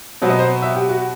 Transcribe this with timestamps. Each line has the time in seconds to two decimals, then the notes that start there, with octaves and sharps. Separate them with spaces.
0.22 B2 F#3 B3 C5
0.30 D#5
0.39 C5
0.62 E5
0.75 G4
0.89 F#4